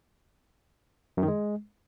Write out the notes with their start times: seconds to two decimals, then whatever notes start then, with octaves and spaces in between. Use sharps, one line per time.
1.17 F#2
1.23 D#3
1.28 G#3